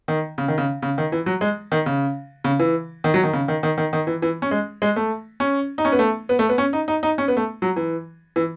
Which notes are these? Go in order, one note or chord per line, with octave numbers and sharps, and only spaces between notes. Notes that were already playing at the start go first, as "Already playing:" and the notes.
D#3
C#3
D#3
C#3
C#3
D#3
E3
F#3
G#3
D#3
C#3
C#3
E3
D#3
F#3
D#3
C#3
D#3
D#3
D#3
D#3
E3
E3
C#4
G#3
G#3
A3
C#4
D#4
C#4
B3
A3
B3
A3
B3
C#4
D#4
D#4
D#4
C#4
B3
A3
F#3
E3
E3